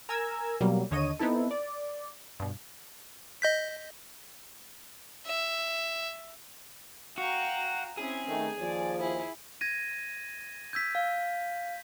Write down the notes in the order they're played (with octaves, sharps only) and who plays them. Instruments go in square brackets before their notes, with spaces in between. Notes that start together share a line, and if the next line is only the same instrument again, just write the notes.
[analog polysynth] A#4 G#5 A#5 E6 G#6
B2 F#3 G3 A#3
D#2 D3 C#5 D#5 D#7
B3 C4 D#4 E4 A4
D5
G2 B2
[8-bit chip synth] D#5 G6 B6
[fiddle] E5
[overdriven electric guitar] F#4 [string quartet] F5 G5 A#5
[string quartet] C4 C#4 E4 [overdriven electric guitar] G#4
[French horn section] D#3 A3 [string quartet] D#4
[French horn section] D#2 F3 [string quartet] D5 G#5
[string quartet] E4 G#4
[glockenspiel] G#6 A#6 D#7
[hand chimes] E6 G#6 [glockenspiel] G6 B6
[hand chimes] F5